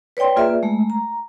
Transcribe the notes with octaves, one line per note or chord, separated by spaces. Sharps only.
B4 C#5 D5 G5 C6
A#3 F4 G#4 B4 D5 E5
G#3 A3
A#5